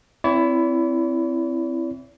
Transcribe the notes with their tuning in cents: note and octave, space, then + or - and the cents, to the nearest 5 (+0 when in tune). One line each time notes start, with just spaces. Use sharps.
C4 -5 E4 +10 D5 -45